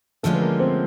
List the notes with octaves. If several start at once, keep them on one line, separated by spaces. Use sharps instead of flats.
D3 F3 G#3 A3 C#4 F4 A4
B4
A#3 A#4
C4 C5